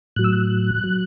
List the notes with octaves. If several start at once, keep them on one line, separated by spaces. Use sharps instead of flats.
A2 F#3 F#6
E6
F#6
F#3